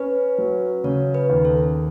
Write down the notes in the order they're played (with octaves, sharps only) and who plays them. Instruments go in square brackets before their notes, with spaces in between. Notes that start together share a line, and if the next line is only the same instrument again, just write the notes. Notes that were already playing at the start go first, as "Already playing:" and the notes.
Already playing: [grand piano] C#4 [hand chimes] B4
[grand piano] F#3
[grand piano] C#3 [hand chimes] C#5
[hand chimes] B4
[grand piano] D#2
[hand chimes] A4